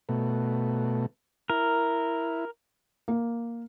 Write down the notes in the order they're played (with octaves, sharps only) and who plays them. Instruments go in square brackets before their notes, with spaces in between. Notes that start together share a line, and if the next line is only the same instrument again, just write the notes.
[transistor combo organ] B2 A3
[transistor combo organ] E4 [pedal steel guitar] A#4
[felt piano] A#3